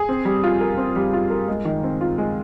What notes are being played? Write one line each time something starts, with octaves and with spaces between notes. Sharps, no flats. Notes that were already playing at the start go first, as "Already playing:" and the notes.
Already playing: G#4
C4
G3
F4
A#4
C4
G3
F4
A#4
G#3
D#3
C4
F4
G#3